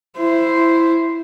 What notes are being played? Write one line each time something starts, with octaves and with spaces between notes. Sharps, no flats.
E4 C5